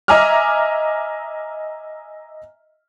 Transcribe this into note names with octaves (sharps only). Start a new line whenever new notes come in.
D#5 E5 G#5 A#5 D6 F6